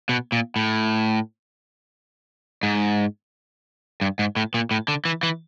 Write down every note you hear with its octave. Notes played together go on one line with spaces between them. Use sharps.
B2
A#2
A2
G#2
G2
G#2
A2
A#2
A2
D3
E3
E3